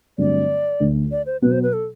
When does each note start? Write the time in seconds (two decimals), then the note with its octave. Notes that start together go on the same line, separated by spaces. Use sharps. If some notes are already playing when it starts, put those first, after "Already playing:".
0.18 G2 D3 F#3 A3 C4 D5
0.80 D2 D3 A3 D4
1.11 D5
1.26 C5
1.42 B2 F#3 B3 B4
1.52 C5
1.63 B4
1.73 A4